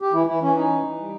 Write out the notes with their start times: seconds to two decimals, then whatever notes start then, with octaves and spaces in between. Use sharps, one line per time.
0.02 G4
0.13 E3 E4
0.26 E3 E4
0.42 E3 C#4
0.55 C#4 D#4
0.69 E3
0.84 E3
0.98 G3